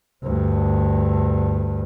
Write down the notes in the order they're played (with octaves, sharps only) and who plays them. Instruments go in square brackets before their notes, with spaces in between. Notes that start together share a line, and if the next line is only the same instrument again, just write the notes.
[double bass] D2 G2